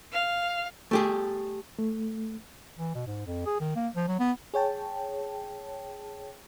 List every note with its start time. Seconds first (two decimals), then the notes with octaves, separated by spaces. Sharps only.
0.12 F5
0.91 A3 G4 G#4
1.79 A3
2.79 E3
2.95 B2
3.06 G#2
3.26 F2
3.46 G#4
3.60 D#3
3.75 A#3
3.96 F3
4.08 F#3
4.19 B3
4.54 G#4 C#5 G5 A5